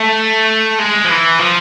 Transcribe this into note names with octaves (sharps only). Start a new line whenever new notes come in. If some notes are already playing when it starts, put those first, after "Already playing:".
Already playing: A3
G#3
F3
E3
F3